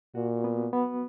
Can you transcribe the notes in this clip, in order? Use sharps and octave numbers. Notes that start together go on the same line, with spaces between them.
A#2 F#4
B3
B3